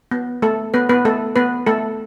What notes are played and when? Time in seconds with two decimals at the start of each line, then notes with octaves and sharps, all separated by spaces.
0.11 B3
0.42 A3 A4
0.74 B3 B4
0.89 B3 B4
1.05 A3 A4
1.36 B3 B4
1.66 A3 A4